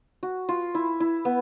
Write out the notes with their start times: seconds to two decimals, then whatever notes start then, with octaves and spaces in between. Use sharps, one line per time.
0.23 F#4
0.49 F4
0.75 E4
1.00 E4
1.25 B3